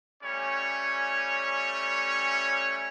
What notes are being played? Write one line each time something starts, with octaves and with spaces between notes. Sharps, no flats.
G3 A3 C#4 C#5 G#5